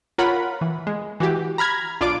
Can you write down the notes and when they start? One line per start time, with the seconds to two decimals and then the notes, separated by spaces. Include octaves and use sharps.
0.18 F4 A#4 C#5 F#5 B5
0.61 E3
0.87 G#3
1.20 E3 F#4 G4
1.58 A#5 B5 F6 G#6
2.00 B1 D4 F4 D5 D6 D7